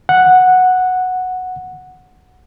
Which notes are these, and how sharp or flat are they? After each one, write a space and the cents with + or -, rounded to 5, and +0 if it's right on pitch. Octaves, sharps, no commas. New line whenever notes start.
F#5 -5